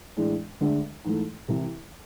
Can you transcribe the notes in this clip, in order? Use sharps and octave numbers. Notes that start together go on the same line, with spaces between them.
A2 E3 G#3 D4
D2 D3 G#3 D4
G#2 E3 A3
C2 C3 E3